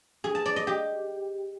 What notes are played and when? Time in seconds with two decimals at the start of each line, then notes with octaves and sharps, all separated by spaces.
0.24 G#4
0.35 A5
0.46 D5
0.56 D#5
0.67 G4